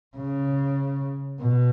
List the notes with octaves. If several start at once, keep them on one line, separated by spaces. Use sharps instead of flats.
C#3
B2